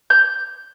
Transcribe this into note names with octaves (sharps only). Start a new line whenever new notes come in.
G6